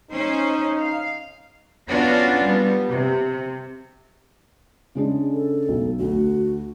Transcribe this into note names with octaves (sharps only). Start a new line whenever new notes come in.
C#4 D#4 C5
F5
B3 C#4 D4 F4 F#4
G3 B3
C3
C#3 G#3 D4
A4
B1
D2 F#4